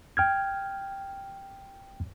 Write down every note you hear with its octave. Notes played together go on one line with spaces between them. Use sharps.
G5 F6 G#6